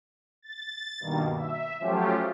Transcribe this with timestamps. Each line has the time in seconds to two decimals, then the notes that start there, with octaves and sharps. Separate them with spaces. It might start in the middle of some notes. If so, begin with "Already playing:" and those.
0.42 A6
1.00 G2 B2 D#3 A#3
1.36 E5
1.80 F3 F#3 A3 C#4 F4 G4